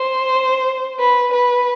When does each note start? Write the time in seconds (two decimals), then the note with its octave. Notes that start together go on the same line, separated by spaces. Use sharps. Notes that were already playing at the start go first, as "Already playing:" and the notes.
Already playing: C5
0.99 B4
1.33 B4